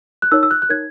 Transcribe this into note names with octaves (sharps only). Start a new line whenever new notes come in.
F#6
D#4 A#4 C#5 E6
E6
F#6
F#6
D#4 A#4 C#5 G#6